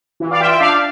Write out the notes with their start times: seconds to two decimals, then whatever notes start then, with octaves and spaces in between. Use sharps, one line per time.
0.20 E3
0.31 D5 F5
0.40 F4 E5 G5
0.50 E5 G5
0.60 D4 D5 F5